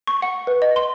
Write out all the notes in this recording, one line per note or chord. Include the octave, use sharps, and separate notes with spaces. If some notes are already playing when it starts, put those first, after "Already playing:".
C#6
F#5
B4
D#5
C6